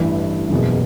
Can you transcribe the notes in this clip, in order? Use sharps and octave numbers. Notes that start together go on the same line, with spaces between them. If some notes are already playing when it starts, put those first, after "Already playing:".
Already playing: A1 G2 E3
F#1 E2 B2